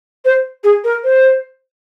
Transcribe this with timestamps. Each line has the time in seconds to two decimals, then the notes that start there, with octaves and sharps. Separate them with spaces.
0.25 C5
0.64 G#4
0.84 A#4
1.04 C5